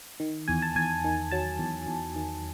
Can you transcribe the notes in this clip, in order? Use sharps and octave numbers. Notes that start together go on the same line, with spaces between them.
D#3
E2 G#5
A5
E2 G#5
D#3
F#3 A5
E2
E2
D#3